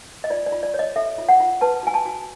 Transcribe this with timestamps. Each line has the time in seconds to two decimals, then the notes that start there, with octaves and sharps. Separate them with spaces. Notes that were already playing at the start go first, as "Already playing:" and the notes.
0.24 D#5
0.30 F4 D5
0.46 D5
0.52 F4
0.63 D5
0.74 C#5
0.79 D#5
0.96 A4 E5
1.18 F4
1.29 F#5
1.40 F4
1.61 B4 A5
1.83 F#4 G#5
1.94 A5
2.06 F#4